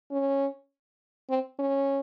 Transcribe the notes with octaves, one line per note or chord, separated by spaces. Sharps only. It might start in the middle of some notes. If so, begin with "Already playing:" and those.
C#4
C4
C#4